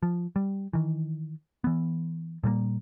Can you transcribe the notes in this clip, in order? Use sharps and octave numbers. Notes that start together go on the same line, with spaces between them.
F3
G3
D#3 E3
E3 B3
A#2 G3 G#3 A#3